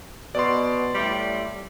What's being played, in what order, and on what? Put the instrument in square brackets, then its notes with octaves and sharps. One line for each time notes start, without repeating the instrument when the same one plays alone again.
[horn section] B2 [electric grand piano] D5 C6
[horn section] A2 G3